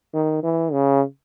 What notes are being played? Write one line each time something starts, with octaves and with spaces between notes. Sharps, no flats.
D#3
E3
C#3